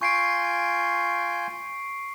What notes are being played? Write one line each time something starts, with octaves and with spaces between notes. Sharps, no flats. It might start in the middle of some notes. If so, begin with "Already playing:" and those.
F4 G#5 C#6 G6 C7 D7